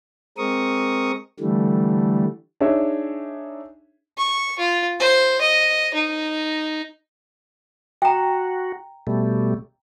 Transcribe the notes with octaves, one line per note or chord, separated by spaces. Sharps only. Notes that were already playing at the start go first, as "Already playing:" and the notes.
G#3 C4 A#4 C#6 D#6
D3 E3 G3 A3
D4 D#4 G#4 C#5 E5
C#6
F4
C5
D#5
D#4
F#4 G5 A#5
B2 G3 A3